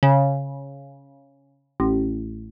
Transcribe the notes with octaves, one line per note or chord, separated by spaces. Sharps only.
C#3
A1